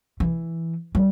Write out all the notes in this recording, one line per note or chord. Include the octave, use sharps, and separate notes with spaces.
E3
G3